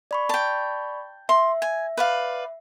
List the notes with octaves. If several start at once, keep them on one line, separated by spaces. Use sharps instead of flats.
D5 B5 C#6
G5 A5
E5 C6
G#5
B4 D5 F5